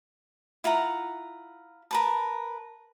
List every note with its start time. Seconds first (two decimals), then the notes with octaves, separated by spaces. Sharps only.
0.64 E4 F4 F#5 A#5
1.91 A#4 B4 A5